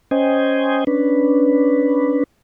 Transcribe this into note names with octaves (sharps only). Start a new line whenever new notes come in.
C#4 C5 D#5 G5 G#5
C#4 D4 B4